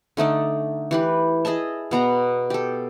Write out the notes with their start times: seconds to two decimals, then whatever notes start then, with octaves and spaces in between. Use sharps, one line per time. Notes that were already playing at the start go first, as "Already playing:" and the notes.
0.17 D3 A3 D#4 D5
0.91 E3 G4 B4
1.45 G#4 D#5 E5 A5
1.91 B2 B3 A#5
2.50 G4 A4